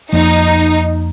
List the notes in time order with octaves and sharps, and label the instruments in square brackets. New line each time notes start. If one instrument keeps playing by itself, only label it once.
[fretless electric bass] F2 F3 A#3 [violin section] D#4